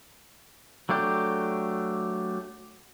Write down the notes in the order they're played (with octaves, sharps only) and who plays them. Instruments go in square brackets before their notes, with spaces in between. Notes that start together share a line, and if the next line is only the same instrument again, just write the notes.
[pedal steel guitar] F#3 A3 D4 G4 G6